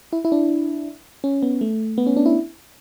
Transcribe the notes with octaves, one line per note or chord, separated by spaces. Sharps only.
E4
E4
D4
C#4
B3
A3
B3
C#4
D4
E4